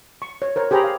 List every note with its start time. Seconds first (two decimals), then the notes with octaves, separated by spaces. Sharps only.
0.22 C#6
0.42 C#5
0.56 A#4 C5 C#5
0.71 G4 G#4 C5 G5 A#5 B5
0.84 F5